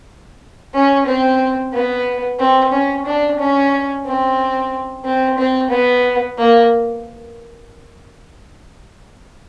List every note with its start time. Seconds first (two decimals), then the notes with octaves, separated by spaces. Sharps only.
0.74 C#4
1.06 C4
1.74 B3
2.39 C4
2.72 C#4
3.06 D4
3.38 C#4
4.06 C4
5.05 C4
5.38 C4
5.71 B3
6.38 A#3